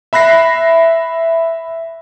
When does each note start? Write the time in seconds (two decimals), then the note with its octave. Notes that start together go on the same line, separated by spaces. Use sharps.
0.13 E5 B5 F#6 A#6 C7